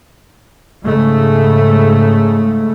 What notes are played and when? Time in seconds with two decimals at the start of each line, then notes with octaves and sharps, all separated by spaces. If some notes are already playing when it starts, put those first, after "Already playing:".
0.85 G#2 C#3 A3